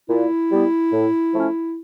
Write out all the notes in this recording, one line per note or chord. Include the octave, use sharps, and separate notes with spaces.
A#2 E4
G3 B3
A2
F3 A3 C#4